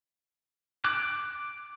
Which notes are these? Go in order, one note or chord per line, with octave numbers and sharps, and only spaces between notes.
D6 F#6